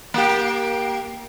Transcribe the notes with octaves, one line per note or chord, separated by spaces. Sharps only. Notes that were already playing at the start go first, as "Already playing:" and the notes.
A#3 G4